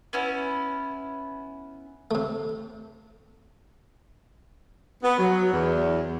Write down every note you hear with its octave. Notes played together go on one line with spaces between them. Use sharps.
B3 C#4 E4
C3 A3
B3
F#3
E2